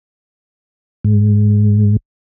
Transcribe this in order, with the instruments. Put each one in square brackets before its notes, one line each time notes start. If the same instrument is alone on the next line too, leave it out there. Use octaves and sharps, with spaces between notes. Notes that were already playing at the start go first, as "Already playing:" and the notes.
[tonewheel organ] G#2